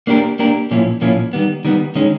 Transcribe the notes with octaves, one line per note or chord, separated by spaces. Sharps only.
A#3 D4 G4 A#4
A#3 D4 G4 A#4
A#2 F3 A#3 C#4 E4
A#2 F3 A#3 C#4 E4
D#3 G3 B3
D#3 G3 B3
D#3 G#3 C#4